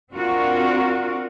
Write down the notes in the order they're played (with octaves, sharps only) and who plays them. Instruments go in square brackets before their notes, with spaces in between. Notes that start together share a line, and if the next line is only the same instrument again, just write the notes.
[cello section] C4 D4 F4 F#4 A#4